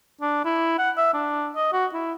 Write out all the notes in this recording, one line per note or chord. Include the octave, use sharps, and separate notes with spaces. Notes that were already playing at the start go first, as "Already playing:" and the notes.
D4
E4
F#5
E5
D4
D#5
F#4
E4